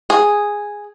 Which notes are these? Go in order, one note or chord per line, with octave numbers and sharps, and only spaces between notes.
G#4